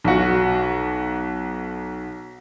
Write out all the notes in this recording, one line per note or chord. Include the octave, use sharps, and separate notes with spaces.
B1 F#4